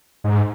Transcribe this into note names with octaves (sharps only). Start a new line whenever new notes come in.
G#2